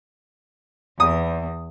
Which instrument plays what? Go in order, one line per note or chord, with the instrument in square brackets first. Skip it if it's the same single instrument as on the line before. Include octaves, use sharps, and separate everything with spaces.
[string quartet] E2 [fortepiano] D#6